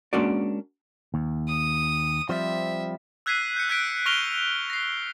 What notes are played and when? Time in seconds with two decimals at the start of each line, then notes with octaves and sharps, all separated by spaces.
0.13 G#3 A#3 C#4 D4 F#4 D5
1.14 D#2
1.48 D#6
2.29 F3 G3 C4 E5
3.26 E6 F#6 G#6 B6 C7 D#7
3.57 G6 C#7
3.69 F#6 G#6 B6 D7
4.06 C#6 F6 A#6 D7 F7 G7
4.70 A#6 C7